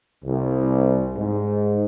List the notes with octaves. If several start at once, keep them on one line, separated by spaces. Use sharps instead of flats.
C2
G#2